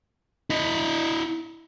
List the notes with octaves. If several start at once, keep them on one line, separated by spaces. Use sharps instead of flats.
E4 D#5